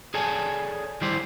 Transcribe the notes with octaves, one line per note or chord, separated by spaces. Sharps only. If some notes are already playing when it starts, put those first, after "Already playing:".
G#4 A4 C#5 D5 G#5 A5
D#3 G3 E4 G4 C5 D5